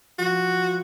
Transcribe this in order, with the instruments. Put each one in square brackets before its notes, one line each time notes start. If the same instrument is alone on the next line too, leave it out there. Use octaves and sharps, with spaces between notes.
[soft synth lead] F3 [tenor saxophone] F#4